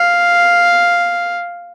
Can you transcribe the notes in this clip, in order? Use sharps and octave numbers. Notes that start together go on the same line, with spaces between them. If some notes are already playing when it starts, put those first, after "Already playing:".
Already playing: F5